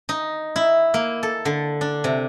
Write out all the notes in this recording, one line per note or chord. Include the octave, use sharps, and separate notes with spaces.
D#4
E4
A#3
A4
D3
D4
C3